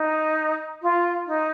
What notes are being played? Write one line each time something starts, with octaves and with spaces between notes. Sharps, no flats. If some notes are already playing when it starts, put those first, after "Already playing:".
Already playing: D#4
F4
D#4